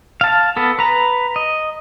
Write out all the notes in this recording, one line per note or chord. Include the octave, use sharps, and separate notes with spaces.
F5 A5
B3 A4
B4 A#5
D#5